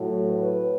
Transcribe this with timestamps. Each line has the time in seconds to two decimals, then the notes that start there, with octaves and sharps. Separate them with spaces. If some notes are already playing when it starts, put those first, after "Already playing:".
Already playing: A2 F#3
0.28 B4